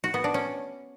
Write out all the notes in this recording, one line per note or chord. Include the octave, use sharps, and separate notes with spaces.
F#4
B3
D4
C#4